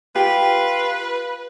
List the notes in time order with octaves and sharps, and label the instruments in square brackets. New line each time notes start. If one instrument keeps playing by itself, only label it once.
[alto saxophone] F4 [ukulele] G4 [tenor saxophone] B4